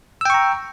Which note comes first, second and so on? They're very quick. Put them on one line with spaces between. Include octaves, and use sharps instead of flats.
E6 G5 C#6 A#5